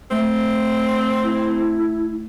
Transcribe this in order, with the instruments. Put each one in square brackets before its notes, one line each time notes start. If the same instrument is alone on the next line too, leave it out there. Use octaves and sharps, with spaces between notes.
[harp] A3 [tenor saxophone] C4
[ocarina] E4